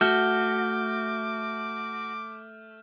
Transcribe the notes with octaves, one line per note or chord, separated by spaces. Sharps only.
A3 F#4 D6 F6 G6 G7